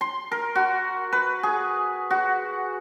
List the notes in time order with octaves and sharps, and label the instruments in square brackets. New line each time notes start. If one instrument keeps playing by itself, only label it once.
[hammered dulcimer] C6
A#4
F#4
B4
G#4
F#4